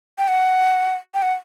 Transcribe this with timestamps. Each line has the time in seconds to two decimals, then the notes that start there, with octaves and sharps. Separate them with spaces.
0.18 G5
0.28 F#5
1.14 G5
1.22 F#5